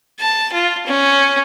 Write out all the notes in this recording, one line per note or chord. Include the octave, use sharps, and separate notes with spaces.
A5
F4
C#4